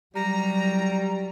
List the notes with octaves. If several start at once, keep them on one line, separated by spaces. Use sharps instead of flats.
F#3 G3 A#5